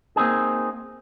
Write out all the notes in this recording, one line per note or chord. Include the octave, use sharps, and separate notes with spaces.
A#3 C4 D#4 G#4